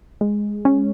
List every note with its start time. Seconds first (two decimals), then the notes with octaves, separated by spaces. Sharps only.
0.21 G#3
0.65 C#4